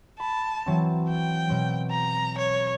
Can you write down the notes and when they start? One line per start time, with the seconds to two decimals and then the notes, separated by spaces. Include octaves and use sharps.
0.20 A5 B5
0.66 E3 F#3 C4
1.10 G5
1.49 B2 F#3 C4
1.91 A#5
2.38 C#5